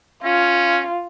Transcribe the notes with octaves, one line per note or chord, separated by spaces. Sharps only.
C#4 F4